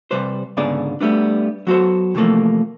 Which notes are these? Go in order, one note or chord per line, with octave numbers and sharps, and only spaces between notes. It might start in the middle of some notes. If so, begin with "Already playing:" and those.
C3 G3 B4 C5
C#2 G#2 D3 B3 G#4 D5
G3 A3 B3 D4
F#3 B3 F#4 G4 A4 C5
C3 E3 F3 A3 A#3